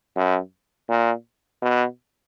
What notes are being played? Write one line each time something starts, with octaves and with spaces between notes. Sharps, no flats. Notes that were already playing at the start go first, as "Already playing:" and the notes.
F#2
A#2
B2